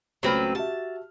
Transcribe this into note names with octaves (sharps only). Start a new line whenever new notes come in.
C#2 F#3 A3 C4 B4 F6
F#4 G4 E5 A5